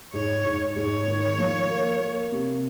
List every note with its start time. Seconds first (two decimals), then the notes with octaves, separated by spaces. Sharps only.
0.14 G#2 C#5
0.45 G#2
0.76 G#2 C#5
1.07 D#3
1.38 F3
1.69 A#3
2.00 A#3
2.32 C3